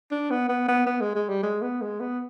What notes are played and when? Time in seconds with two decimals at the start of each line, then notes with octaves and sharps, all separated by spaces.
0.11 D4
0.30 B3
0.49 B3
0.68 B3
0.86 B3
1.01 G#3
1.15 G#3
1.29 G3
1.43 G#3
1.62 B3
1.81 G#3
2.00 B3